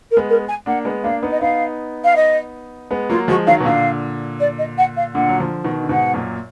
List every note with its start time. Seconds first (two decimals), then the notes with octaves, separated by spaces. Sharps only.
0.11 A#4
0.17 G#3 B3
0.29 A#4
0.48 G#5
0.66 A#3 D4 F#5
0.85 G#3 B3
1.03 A#3 D4 F5
1.23 B3 D#4
1.31 D#5
1.41 B3 D#4 F5
2.04 F5
2.16 D#5
2.91 G#3 B3
3.10 F#3 A#3 F4
3.28 F3 G#3 F#4
3.47 D#3 F#3 F5
3.60 B2
3.65 A#2 D3 F5
4.40 D5
4.58 D#5
4.78 F#5
4.96 F5
5.14 A#2 D3 F#5
5.28 F#3
5.40 D3 F3
5.65 B2 D#3
5.82 D3
5.89 G#2 B2 F#5
6.14 F#2 A#2